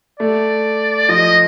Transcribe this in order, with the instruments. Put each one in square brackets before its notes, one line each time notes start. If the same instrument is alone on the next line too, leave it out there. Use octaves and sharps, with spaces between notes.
[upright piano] A3 [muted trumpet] D5
[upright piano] F3 [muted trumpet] D#5